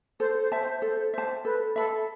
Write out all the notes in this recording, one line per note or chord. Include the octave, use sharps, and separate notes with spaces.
A4 C5
C5
E5 A5
C5
A4 C5
C5 E5 A5
A4 B4
A4 E5 B5